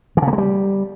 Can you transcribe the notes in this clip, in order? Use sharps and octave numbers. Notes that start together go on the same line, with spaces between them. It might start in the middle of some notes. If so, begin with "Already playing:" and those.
E3
C#3
A#3
G#3
G3